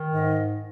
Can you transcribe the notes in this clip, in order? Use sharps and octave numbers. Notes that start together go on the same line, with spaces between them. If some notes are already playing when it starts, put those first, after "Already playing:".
Already playing: D#3
G#2
D#5